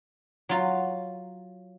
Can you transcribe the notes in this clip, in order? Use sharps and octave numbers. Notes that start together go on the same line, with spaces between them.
F#3 F4